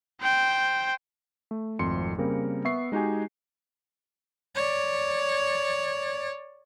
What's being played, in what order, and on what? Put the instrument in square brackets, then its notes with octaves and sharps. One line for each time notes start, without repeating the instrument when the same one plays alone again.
[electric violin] C5 G5
[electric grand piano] A3
G#1 F2 A3 C6 C#7
C#3 G3 A#3 C4 A#4
B3 E5 C#6 C7
G#3 D#4 F#4 G4 G#5
[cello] C#5 D5